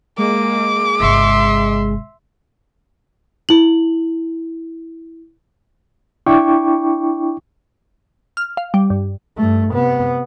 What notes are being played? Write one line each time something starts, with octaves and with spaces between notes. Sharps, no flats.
G#3 A#3 D6
G1 C3 E5 C6
E4 F#7
D4 E4 G5 C#6 D6
F6
F5
G3
G2
G2 A3
C3 B3